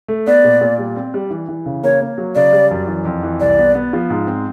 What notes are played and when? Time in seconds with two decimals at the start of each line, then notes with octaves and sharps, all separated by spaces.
0.08 A3
0.27 B3 D5
0.44 A#2
0.61 A#2
0.78 G3
0.96 C4
1.14 G3
1.31 E3
1.48 E3
1.66 C#3
1.83 A#3 C#5
2.01 A#3
2.18 F#3
2.35 C#3 D5
2.53 G3
2.71 F#2
2.87 E3
3.05 F2
3.23 E3
3.40 C2 D5
3.58 B3
3.75 B3
3.93 F3
4.10 G#2
4.27 C4